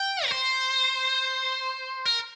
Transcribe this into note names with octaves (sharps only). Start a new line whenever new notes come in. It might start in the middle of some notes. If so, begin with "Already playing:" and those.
Already playing: G5
A#4
C5
A#4